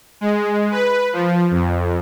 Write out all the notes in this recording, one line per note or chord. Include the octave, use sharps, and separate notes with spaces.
G#3
B4
F3
F2